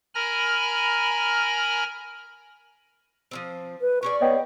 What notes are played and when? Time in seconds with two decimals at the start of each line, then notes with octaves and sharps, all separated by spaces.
0.15 A#4 G#5 A#5 B5 F6 A#6
3.31 F3 A#3 C4
3.81 B4
4.03 C#4 G#4 D5 C#6
4.21 B3 C#5 D#5 G5